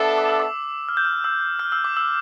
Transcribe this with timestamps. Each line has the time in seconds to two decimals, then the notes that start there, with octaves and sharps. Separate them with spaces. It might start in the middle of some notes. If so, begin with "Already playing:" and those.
Already playing: B3 D4 A4 E5
0.18 D6
0.29 E6
0.40 D6
0.89 F6
0.97 G6
1.05 F6
1.24 E6
1.59 F6
1.72 E6
1.84 D6
1.97 E6